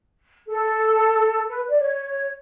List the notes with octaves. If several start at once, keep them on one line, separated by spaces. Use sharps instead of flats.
A4
B4
D5
C#5